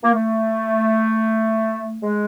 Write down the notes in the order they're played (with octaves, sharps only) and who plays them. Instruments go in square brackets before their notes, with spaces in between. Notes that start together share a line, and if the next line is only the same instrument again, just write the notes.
[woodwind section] A#3
A3
G#3